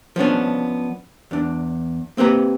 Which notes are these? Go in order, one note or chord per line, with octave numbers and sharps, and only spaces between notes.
F3 B3 C#4 D4
E2 D4
A#3 C4 G4 B4 A#5